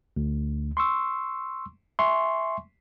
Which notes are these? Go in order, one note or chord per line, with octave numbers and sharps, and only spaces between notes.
D2
C6 C#6 E6
E5 G#5 C6 C#6